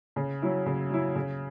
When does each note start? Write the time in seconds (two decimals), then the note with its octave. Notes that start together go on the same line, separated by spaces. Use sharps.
0.16 C#3
0.42 F#3 C#4 E4
0.66 C#3
0.90 F#3 C#4 E4
1.15 C#3